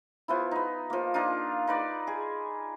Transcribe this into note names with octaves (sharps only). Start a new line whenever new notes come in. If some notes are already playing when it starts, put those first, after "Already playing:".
F3 B3 E4
B3 D#4
F3 A#3
A#3 D4 D#4 F4
D#4 B4 D5
G#4